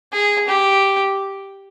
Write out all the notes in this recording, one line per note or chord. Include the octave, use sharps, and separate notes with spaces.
G#4
G4